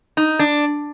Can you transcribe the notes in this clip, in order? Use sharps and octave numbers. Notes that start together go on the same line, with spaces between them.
D#4
D4